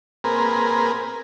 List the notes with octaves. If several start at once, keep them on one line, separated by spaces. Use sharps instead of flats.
A#3 C4 G#4 A#4 B4